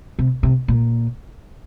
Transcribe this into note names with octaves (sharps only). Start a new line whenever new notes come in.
C3
C3
A#2